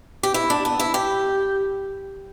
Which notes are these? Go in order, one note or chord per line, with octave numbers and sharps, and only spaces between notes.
G4
E4
D4
B3
E4
G4